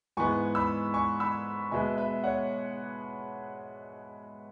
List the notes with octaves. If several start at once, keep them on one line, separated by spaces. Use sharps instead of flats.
G#2 E3 G#3 B3 G#5 C#6
B5 E6
G#5 C#6
B5 E6
B2 G#3 B3 E5 G#5
B4 E5
C#5 F#5